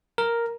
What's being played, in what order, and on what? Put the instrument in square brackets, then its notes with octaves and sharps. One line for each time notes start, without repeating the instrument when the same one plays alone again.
[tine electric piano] A#4